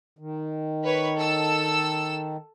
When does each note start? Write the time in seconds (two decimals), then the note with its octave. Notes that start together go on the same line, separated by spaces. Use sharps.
0.19 D#3
0.83 B4 C#5
1.17 A4 E6